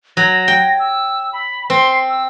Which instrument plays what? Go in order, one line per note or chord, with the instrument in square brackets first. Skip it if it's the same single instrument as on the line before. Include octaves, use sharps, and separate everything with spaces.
[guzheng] F#3 [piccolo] A#6
[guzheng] G5
[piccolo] E6
B5
[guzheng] C4 [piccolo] C6
[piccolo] E6